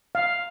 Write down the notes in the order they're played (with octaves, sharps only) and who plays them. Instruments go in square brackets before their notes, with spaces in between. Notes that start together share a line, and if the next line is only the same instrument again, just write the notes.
[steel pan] F5